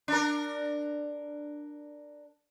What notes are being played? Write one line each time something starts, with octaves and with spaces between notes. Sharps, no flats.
D4 A#4